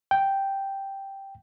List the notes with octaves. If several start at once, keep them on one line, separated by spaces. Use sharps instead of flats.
G5